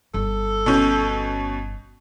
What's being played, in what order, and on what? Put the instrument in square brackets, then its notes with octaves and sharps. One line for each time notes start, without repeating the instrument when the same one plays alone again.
[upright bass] G1 [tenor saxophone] A4
[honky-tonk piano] B2 C#4 G6